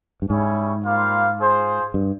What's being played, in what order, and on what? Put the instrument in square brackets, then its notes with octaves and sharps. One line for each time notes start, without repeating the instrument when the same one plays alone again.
[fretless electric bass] G2
[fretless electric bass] G#2 [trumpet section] G3 C#4 E4 G#4 C#5
[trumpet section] G3 A#3 F4 C5 F5
F4 G#4 C5
[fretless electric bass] G2